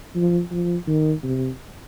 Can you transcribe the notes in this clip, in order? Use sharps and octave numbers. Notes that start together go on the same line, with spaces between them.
F3
F3
D#3
C3